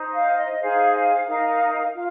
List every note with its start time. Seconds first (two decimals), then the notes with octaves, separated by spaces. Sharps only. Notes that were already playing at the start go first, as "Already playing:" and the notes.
Already playing: D#4 C5
0.13 F5
0.36 D#5
0.59 D#4 G#4 C5 F5
0.92 F5
1.27 D#4 A#4 F5
1.94 F4 F5